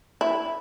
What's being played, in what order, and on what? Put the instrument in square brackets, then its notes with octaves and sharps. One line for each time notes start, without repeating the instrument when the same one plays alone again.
[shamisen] E4